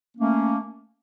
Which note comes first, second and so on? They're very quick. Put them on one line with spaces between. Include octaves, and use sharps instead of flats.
A#3 C#4 A3